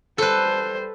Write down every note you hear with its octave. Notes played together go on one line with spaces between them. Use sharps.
G3 A4 B4 C5